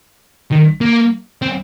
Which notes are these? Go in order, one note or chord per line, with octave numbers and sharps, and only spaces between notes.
D#3
A#3
C4